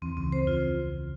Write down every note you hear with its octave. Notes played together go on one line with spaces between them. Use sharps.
E2 E3 C4
C#2 C#3 C4
F2 C5
F4